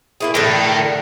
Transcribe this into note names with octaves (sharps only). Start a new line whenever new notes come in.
A#3 E4 G#4
A2 D3 A#4 G5